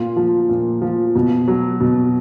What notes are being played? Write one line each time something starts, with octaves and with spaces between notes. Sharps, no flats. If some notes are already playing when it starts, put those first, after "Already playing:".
Already playing: A#2 F4
F3
A#2
F3
B2
F#3
B2